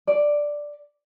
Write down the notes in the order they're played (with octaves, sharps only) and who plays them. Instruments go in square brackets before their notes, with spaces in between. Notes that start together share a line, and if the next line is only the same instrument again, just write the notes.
[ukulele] D5